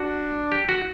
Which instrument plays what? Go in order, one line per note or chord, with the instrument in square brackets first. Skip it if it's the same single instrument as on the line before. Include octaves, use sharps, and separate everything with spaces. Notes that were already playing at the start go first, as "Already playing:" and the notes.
Already playing: [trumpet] D4 [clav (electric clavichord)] F#4
[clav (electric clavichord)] G4
F#4